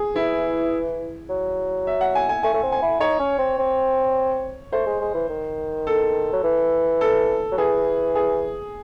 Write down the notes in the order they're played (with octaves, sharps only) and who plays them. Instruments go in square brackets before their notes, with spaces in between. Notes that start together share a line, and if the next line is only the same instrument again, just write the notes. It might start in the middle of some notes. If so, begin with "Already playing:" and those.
Already playing: [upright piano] G#4
[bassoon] E3 [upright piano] E4
[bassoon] F#3
[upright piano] E5
F#5
G#5
G#5
[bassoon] A3 [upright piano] G#5
[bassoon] A3
C4
[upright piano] G#5
[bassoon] E4
[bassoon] D#4 [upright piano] C#5
[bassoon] C#4
C4
C4
[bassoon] A3 [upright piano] C5
[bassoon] G#3
G#3
E3
D#3
[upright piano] A4
[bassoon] F#3
E3
[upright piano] A4
[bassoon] F#3
[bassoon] E3 [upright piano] G#4
[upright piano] G#4